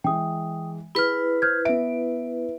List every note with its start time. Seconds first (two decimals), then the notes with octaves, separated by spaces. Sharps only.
0.04 E3 G#3 G5 D#6
0.95 E4 G#4 B4 B5 F6
1.42 C5 F6 G6 G#6
1.65 B3 E5 D7